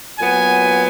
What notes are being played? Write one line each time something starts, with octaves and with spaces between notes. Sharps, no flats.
A#2 F#3 B3 G#5